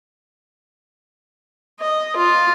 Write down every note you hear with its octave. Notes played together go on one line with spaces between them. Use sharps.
D#5
F4